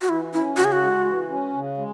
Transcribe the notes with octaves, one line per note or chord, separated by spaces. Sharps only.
F#4
E3 E4
C#4 E4
C#3 F#4
G#4
F#4
G#3
E3
C#4
C#3
G#3